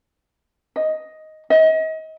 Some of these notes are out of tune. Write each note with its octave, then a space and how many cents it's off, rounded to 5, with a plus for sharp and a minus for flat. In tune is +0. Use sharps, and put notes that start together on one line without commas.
D#5 +5
D#5 +35